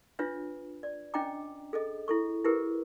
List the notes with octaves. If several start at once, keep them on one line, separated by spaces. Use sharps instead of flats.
D4 F4 B4 C#5 E5
D5
C#4 D4 D#5 G5 A#5 D6
G#4 A4 D#5
E4 A4 C#6
E4 G4 G#4 A#4 B4